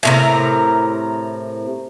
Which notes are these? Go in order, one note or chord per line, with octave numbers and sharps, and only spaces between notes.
A2 C3 A#4